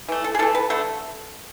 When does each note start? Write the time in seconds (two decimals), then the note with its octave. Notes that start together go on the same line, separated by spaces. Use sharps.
0.09 E3 A3
0.24 A4
0.35 G#4
0.39 E3 A3 A4
0.55 B4
0.70 D3 A3 A4